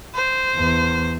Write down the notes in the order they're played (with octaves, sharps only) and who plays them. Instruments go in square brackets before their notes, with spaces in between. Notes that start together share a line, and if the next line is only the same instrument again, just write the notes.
[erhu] C5
[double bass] E2